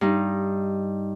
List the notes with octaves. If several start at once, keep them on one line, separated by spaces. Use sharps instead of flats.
G2 D#4